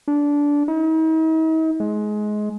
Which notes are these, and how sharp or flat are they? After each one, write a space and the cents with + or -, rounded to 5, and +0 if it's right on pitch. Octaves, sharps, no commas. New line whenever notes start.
D4 -20
D#4 +45
G#3 +20